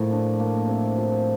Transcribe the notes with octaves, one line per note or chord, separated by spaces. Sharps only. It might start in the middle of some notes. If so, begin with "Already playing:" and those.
Already playing: A2 F3 A#3
D4
A#3
C3
F3